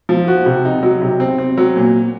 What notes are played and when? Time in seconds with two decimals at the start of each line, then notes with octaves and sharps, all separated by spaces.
0.09 F3
0.28 F#4
0.46 C3
0.65 D#4
0.83 F#3
1.01 C3
1.20 C4
1.38 C4
1.58 F#3
1.76 A#2